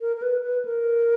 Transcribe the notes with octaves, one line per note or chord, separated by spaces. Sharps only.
A#4
A#4
B4
B4
A#4